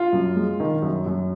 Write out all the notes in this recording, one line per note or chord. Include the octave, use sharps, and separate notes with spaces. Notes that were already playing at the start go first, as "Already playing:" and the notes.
Already playing: F4
F#2
G#3
D#3
F#2
F#2